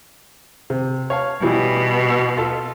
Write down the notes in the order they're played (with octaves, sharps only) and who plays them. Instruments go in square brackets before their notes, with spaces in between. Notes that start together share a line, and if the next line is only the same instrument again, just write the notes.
[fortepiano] C3
C#5 F5 A5
[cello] B2 [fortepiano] E3 G3
[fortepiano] F4 A4